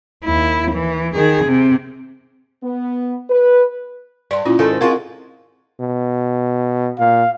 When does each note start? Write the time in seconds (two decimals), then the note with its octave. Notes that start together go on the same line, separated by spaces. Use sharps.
0.25 D#2 E4
0.72 E3
1.15 D#3 G#4
1.45 C3
2.64 B3
3.30 B4
4.31 G2 D5 C6
4.46 A#2 C#4 E4 F4
4.59 G#2 D#3 A3
4.81 G#3 C4 F4 F#4 A#4
5.80 B2
6.99 A#2 F5